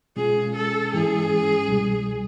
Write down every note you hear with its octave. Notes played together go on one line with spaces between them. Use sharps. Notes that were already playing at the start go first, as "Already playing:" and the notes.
B2 G#3 C#4 F4 G#4
A4
G#2 E3 G#3 C#4 E4 G#4
C2 B2 G3